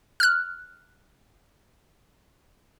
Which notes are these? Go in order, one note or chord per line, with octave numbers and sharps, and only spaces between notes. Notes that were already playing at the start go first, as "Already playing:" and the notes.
F6 F#6